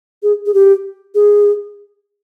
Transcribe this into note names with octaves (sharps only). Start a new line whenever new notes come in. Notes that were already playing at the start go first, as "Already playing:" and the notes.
G#4
G#4
G4
G#4